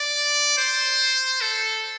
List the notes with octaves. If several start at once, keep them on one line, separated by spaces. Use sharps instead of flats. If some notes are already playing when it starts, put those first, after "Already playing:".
Already playing: D5
C5
A4